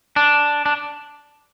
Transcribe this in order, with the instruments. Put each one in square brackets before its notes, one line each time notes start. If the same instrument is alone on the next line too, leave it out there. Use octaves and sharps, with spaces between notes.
[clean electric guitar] D4
D4